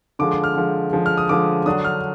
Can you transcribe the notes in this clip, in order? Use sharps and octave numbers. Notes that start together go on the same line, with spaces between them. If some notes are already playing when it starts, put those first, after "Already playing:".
D3 F3 G#3 D6
D6
F6
D3 F3 G#3
D3 F3 G#3
F6
D#6
D3 F3 G#3 D6
D3 F#3 D4 D#6
F6